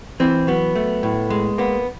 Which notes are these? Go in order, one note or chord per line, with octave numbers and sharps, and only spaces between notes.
E3 C4
F#3 B3
A3
A2
G#3
A#3 B3